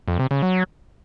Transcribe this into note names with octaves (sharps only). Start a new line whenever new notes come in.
F2
C3
C#3
F#3